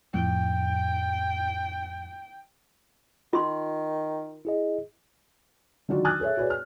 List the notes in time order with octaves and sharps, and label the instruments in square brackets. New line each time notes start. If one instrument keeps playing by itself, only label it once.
[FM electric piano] F2 A2 [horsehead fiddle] G5
[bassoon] D#3 [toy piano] F4 C6
[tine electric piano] E4 G#4 D#5
[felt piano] D3 D#3 F#3 F4 F#4 D5
D6 D#6 F6 F#6 G#6 A6
G#4 A4 C#5 E5
F#4 G#4 B4 C#5 D5
F6